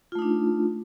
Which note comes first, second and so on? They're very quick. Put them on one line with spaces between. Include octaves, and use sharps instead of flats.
F4 A3 D#4 D4